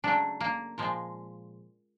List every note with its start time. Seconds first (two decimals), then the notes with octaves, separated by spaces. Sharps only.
0.04 C#3 F#3 A3 D4
0.41 A#3
0.78 A#2 F3 G#3